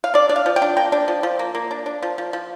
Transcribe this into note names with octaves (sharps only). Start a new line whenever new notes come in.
F5
D4 D5
D4 D5
F5
F3
G5
D4
A#3 G5
D4
F3
F3
A#3
A#3
D4
D4
F3
F3
F3